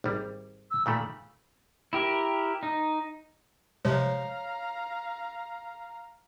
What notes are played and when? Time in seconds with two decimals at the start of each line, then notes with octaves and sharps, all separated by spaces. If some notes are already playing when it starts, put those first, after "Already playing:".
0.04 G#1 G3
0.71 E6
0.86 A#2 D#3 A3 B5
1.93 E4 G4 A#4
2.63 D#4
3.85 C3 F3 G#3 C#5 F5 A#5